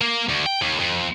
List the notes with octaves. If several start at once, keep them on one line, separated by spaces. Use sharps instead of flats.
A#3
D2
G5
D#2
F2